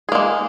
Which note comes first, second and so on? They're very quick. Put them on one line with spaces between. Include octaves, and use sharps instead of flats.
G#4 A#3 G#3